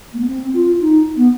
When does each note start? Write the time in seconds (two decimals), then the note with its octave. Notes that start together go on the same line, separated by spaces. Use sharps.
0.13 A#3
0.20 B3
0.27 C4
0.54 F4
0.81 D#4
1.17 B3